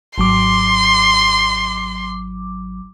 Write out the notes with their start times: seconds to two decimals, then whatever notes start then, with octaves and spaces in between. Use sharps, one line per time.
0.18 G#1 F#3 C6 D6